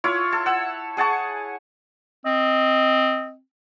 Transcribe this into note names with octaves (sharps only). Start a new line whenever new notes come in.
E4 F4 C#5
A4
F#5 E6
G#4 F#5 A5 C#6
C4 D#5